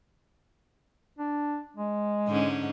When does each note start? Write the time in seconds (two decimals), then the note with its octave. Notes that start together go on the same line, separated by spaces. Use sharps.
1.19 D4
1.77 G#3
2.28 G#2 D3 C#4